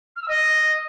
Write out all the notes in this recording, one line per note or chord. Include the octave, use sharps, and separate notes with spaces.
F6
E6
D#5